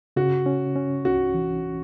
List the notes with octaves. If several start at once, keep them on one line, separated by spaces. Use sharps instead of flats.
C#3 F#4
C#4
C#4
C2 F#4
E3